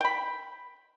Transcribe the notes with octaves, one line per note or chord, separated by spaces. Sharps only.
G5 B5